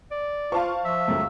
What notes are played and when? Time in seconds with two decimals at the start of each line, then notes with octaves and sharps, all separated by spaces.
0.11 D5
0.52 F4 C5 F5 A5 C#6
0.85 F3 E5
1.08 C#2 F#2 A3